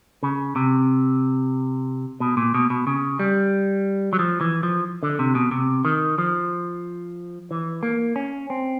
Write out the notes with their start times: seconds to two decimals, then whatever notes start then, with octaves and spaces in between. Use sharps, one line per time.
0.23 C#3
0.56 C3
2.20 B2
2.37 A#2
2.54 B2
2.70 B2
2.87 C#3
3.19 G3
4.13 F#3
4.19 F3
4.41 E3
4.63 F3
5.03 D3
5.19 C3
5.35 B2
5.51 C3
5.85 D#3
6.18 F3
7.51 E3
7.83 A#3
8.16 C#4
8.50 C4